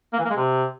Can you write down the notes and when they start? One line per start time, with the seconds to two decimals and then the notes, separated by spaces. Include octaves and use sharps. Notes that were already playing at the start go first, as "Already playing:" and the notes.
0.13 A#3
0.19 E3
0.25 A#3
0.31 G#3
0.36 C3